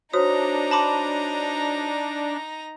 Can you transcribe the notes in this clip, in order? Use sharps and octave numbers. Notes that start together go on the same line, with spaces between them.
D4 D#4 F#4 C5 C#5 A#5 D#6
A5 B5 D6